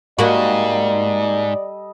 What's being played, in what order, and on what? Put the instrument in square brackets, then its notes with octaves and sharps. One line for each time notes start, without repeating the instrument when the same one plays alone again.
[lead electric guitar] G#2 [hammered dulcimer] G3 A4 D#5 [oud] A#3 F#4 [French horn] D5